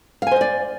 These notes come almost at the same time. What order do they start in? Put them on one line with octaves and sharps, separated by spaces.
F5 G#5 C5 D#5 D5